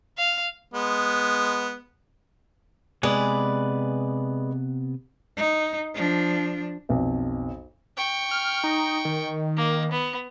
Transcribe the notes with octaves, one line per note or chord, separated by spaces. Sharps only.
F5
G#3 B3
C3 G#3 B3 B4 D5 G#5
D#4
F3 D4
B1 F2
G5 C#6
F6
D#4
D#3
A#3
B3